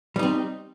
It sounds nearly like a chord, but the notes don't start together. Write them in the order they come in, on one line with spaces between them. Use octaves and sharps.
G3 D#4 C4